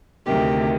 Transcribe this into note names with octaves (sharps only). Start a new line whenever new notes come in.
D2 C3 D#3 G4